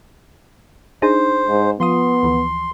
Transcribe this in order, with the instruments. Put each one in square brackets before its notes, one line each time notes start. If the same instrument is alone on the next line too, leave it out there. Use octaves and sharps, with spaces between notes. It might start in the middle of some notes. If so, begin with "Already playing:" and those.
[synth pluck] D4 D#4 G#4 [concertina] C5
[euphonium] G#2
[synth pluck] F3 F4 D#6 [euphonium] B3 [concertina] C6
[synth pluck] D2 E3 F3